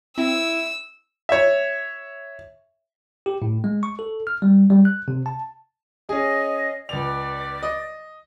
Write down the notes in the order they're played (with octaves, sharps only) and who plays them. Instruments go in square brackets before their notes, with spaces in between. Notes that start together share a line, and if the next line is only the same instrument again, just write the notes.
[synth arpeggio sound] C4 [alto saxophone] E4 [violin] E6
[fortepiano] C#5 E5
[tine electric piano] G4
A2
G#3
C#6
A4
F6
G3
G3
F#6
C3
A5
[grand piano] C#4 G#4 [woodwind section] D#5
[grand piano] C#2 F7 [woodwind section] B4 D5
[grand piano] D#5